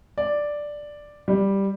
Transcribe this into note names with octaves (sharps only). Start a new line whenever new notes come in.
D5
G3